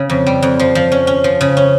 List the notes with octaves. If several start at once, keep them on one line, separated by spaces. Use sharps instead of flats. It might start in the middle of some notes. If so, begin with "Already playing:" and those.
Already playing: C#3
F2
G3
F2
F3
F3
C#4
C#4
F3
C#3
C#4